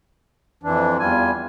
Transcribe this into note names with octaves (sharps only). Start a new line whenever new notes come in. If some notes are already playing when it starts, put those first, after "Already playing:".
F2 E3 D4
E2 G3 F4 G#5